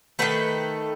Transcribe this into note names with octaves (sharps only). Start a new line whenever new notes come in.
D#3 F#3 A3 A4 B4